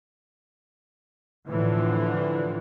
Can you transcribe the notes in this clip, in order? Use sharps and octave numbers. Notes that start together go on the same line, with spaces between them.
A2 D3 E3 F3